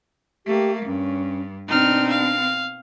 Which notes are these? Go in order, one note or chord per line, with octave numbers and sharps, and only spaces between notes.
A3 A#3 G4
G2 C#4
B2 C4 D4 D#4 F6
F5